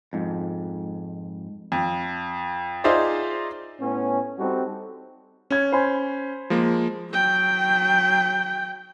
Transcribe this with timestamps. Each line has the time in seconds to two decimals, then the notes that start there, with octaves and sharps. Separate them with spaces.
0.13 F2 G#2
1.72 F2
2.84 D#4 F4 G#4 C5 D5 E5
3.80 A2 B3 C#4
4.39 G3 C4 D#4 F#4 A4
5.50 C#4 C#5 G#6
5.72 C5 G#5 B5
6.50 F3 G#3 A#3
7.11 F#3 G5